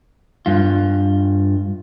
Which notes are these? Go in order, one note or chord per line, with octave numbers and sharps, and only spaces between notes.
G2 F4